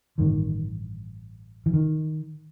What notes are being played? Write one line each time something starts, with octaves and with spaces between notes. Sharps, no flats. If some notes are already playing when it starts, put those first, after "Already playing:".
A1 G2 D3 D#3
E3
D#3